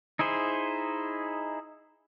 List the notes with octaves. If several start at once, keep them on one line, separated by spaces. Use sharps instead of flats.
D#4 E4 G#4 C5